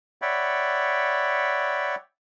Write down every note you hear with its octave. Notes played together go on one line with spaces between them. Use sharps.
C#5 D5 E5 F#5 G5 B5